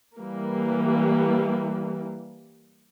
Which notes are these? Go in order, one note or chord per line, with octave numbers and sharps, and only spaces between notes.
E3 G3 A#3